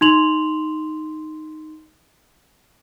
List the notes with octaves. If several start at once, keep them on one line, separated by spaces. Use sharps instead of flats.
D#4 C6 F7 F#7